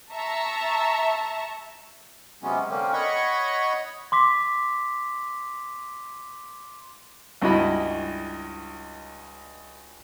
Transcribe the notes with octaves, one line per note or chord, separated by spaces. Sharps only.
E5 A5 A#5 C#6
C3 F#3 G#3 B3 C#4
D3 A#3 C4 C#4
C#5 D#5 F#5 B5 C#6
C6 D6 B6
C#2 G2 E4 F#4 D#5 B5